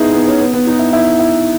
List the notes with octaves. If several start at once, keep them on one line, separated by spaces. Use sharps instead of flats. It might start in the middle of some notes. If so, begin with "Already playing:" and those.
Already playing: B3 D#4 E4 G#4
B3
C#4
B3
B3
D#4
E4
E4
E4